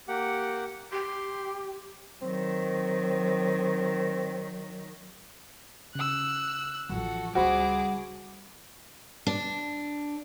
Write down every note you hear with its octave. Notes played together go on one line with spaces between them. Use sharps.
A#3 G4 F#5
G4 C6
D#3 F#3 C4
C#3 E6 F#6
A1 F3 F#4 A4
C#2 C#3 G3 F#4 G#4 C5 B5 D6
D4